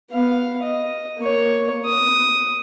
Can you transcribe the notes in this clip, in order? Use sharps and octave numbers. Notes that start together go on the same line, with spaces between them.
B3 F5
D#5
A#3 C#5
D#6